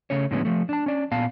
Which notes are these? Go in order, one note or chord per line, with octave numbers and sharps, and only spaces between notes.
C#3 A3 C#4 C#5
A2 D3 F3 G#3 B3 C#4
F3 A3
D4 A5
C#4 D5
A#2 B3 F5 A5